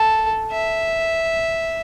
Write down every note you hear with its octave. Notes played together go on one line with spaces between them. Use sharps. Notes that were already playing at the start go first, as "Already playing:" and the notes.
Already playing: A4
E5